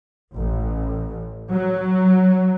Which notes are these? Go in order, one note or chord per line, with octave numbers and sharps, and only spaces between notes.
A1
F#3